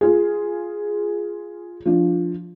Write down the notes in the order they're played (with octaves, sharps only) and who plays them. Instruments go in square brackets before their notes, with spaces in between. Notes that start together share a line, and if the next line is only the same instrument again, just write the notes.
[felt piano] F4 G#4
F3 D4